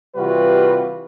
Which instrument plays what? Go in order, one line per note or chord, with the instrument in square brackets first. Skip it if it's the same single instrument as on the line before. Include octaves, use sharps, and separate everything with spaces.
[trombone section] C3 E3 G3 F4 F#4 B4